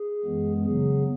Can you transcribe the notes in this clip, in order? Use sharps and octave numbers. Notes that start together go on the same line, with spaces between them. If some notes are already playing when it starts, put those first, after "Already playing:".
Already playing: G#4
F#2 E3 G#3 B3
C#3 F#3 B3 G#4